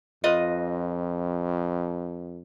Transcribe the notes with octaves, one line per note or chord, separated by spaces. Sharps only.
F2 F4 B4 D#5